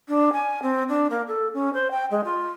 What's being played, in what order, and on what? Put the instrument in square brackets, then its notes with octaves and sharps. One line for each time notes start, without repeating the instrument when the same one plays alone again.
[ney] D4
G#5
C4
D4
A#3
A4
C#4
C5
G5
G#3
F4